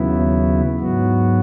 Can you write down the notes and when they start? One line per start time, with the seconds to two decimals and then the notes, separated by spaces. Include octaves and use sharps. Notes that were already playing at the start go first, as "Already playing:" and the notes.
Already playing: D#2 C#3 F#3 B3 E4
0.80 G#2 F#3 B3 F#4